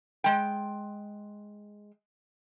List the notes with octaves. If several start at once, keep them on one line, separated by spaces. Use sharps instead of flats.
G#3 G5